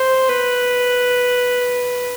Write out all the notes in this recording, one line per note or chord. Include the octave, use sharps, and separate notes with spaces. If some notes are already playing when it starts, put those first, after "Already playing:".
Already playing: C5
B4